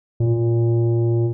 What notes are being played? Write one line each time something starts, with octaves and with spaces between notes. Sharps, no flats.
A#2